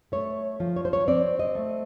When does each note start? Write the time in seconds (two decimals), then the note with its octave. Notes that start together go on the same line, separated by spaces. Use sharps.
0.12 A3 C#5
0.60 F3
0.76 C#5
0.85 C5
0.93 C#5
1.08 C4 D5
1.39 D#5
1.55 A3